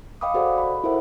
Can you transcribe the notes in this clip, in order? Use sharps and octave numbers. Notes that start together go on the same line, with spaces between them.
D#5 F5 G5 B5 D6 D#6
F#4 G#4 A4 C5 D5 F#5
B5
E4 A4 A#4 C5 E5 F#5